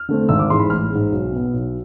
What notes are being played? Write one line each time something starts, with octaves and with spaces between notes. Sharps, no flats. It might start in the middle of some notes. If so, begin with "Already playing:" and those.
Already playing: F6
D3 A3 C4
G#1 E6
D6
G#2 E3 G#3 C6
B5
A1 F6
G#2 G#3
B1
B2 B3
B1